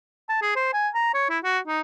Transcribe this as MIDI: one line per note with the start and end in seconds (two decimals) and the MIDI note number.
0.29 0.38 81
0.42 0.51 68
0.56 0.72 72
0.74 0.89 80
0.95 1.13 82
1.14 1.27 73
1.30 1.39 64
1.44 1.59 66
1.68 1.81 63